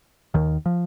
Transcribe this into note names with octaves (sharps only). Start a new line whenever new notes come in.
D#2 D#3
F3